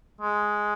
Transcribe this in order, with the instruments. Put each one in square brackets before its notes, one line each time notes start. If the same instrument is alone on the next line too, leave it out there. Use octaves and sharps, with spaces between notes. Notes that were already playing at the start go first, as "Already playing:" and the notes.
[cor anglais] G#3